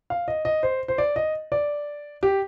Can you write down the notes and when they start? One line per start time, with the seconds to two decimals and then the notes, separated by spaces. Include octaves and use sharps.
0.10 F5
0.28 D#5
0.45 D#5
0.63 C5
0.88 C5
0.98 D5
1.16 D#5
1.52 D5
2.23 G4